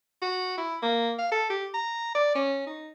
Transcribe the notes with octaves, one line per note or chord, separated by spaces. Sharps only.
F#4
E4
A#3
F5
A4
G4
A#5
D5
C#4
D#4